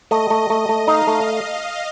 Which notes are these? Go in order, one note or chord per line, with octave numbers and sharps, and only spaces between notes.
A3 D#5
A3
A3
A3
D#4 F5
A3